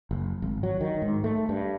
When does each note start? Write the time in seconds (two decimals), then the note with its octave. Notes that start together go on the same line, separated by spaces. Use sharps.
0.11 F#1
0.42 G#1
0.63 F#3
0.81 D#3
1.02 G#2
1.24 A3
1.49 G2